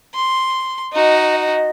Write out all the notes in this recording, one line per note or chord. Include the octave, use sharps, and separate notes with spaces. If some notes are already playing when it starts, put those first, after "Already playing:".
C6
D#4 F#4 D#5
D#5